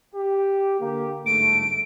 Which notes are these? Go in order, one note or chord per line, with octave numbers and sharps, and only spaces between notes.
G4
D3 A#3 G4
G1 G#2 A3 D7